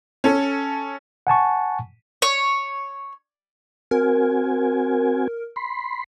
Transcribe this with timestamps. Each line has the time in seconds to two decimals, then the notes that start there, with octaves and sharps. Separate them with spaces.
0.24 C#4 A4
1.27 F#5 G#5 A5 C#6
2.22 C#5
3.91 C4 F#4 A#4 G#5
5.56 B5 C6